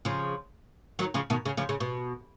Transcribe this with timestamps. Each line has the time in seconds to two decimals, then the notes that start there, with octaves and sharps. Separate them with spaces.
0.05 C#3 F3
0.99 D#3 F#3
1.14 C#3 F3
1.30 B2 D#3
1.45 C#3
1.57 C#3 F3
1.69 C#3
1.80 B2